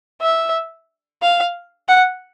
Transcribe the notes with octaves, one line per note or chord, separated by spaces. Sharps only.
E5
F5
F#5